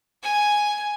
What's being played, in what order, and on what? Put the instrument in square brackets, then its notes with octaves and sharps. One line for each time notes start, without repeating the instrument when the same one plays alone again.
[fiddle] G#5